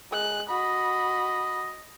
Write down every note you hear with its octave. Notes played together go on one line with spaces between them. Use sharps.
G#3 F#6
F#4 D#5 B5